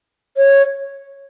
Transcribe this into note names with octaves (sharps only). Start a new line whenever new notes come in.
C#5